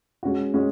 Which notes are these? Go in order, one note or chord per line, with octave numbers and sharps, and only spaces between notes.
G#3 C#4 F#4
G#3 C#4 F#4